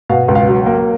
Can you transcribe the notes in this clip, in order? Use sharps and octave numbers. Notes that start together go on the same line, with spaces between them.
B2 F5
C#2
F5
F#3
A#3